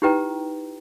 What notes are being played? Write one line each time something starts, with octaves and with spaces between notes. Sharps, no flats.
D#4 E4 G4 B4 G5 A#5